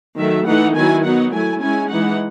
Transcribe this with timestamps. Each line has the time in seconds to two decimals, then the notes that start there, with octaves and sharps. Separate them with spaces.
0.18 D#3 F#3 A3 E5
0.47 E3 A3 D#4 F#5
0.75 D#3 F#3 B3 E4 G#5
1.04 F#3 B3 D#4 F#5
1.33 F#3 A3 E4 G#5
1.62 G#3 C#4 E4 G#5
1.90 E3 G#3 D#4 F#5